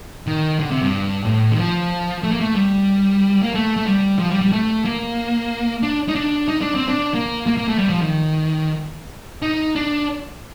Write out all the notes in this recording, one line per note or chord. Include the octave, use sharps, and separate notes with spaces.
D#3
D3
C3
G2
A2
D#3
F3
A3
A#3
A3
G3
A#3
A3
A3
G3
F3
G3
G3
A3
A#3
D4
D#4
D4
D#4
D4
C4
D4
A#3
A#3
A#3
A3
G3
F3
D#3
D#4
D4